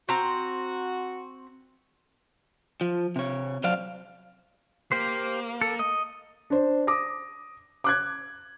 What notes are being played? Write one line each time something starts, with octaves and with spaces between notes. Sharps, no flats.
C4 F#4 A#5
F3
C3 C#5
F2 F#3 C5 D5 F5
A#3 G4 C5
A4
D#5
D4 C5
D6 D#6 A#6
D6 F#6 G#6